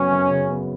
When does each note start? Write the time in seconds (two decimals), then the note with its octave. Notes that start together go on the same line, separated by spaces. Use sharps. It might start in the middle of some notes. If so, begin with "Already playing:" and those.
Already playing: F#2 C#3 F#3 B3 C#4
0.11 F#2
0.30 C#3
0.50 B3